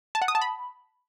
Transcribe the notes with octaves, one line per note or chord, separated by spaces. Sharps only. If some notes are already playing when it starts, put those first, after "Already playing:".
A5
F#5
D#6
A5
B5